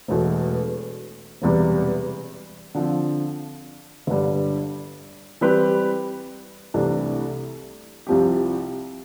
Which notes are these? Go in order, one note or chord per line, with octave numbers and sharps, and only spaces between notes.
E1 E2 B2 A3
E1 E2 C3 G3
D3 F3 C4 F4
G1 G2 D3 G3
E3 G3 C4 G4 B4
C2 C3 E3 A3 D4
C2 C3 F3 C4 G4